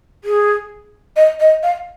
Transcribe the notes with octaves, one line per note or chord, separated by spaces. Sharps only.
G#4
D#5
D#5
F5